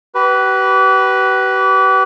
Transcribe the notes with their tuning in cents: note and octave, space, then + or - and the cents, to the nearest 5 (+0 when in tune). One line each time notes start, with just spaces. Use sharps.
G4 -40 B4 +0